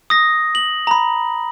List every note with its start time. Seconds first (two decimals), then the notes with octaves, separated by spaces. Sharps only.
0.10 D#6 A#6
0.55 F#7
0.87 A#5 B5